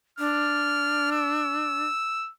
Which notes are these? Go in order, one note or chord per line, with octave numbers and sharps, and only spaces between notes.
D4 F6
E6